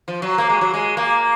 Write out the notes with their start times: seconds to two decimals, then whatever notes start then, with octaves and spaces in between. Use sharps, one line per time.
0.08 F3
0.22 F#3
0.38 A#3
0.49 G#3
0.61 F#3
0.74 G#3
0.97 A#3